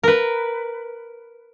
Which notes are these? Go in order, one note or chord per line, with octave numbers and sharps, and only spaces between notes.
A#4 B4